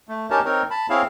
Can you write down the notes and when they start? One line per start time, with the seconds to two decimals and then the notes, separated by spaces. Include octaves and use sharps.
0.08 A3
0.30 C#4 D#4 G4 A#4 C#5 A5
0.45 C4 D#4 A#4 C#5
0.70 A5 B5
0.90 C4 E4 G#4 C#5 F5